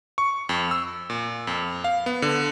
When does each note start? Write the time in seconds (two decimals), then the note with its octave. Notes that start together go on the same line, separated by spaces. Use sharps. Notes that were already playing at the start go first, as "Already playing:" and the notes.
0.18 C#6
0.49 F2
0.71 E6
1.10 A#2
1.47 F2
1.84 F5
2.06 B3
2.22 D3